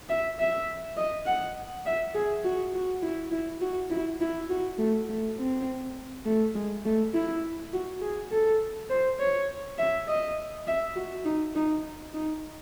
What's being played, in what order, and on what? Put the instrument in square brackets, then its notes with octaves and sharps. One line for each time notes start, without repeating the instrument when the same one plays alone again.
[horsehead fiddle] E5
E5
D#5
F#5
E5
G#4
F#4
F#4
E4
E4
F#4
E4
E4
F#4
A3
A3
C4
A3
G#3
A3
E4
F#4
G#4
A4
C5
C#5
E5
D#5
E5
F#4
D#4
D#4
D#4